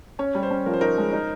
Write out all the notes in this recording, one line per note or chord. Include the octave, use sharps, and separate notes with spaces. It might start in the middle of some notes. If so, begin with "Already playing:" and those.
C#4 C#5
G3
C5
C#4
F3 A#4
C5
D#4 A#4
G#3
D#4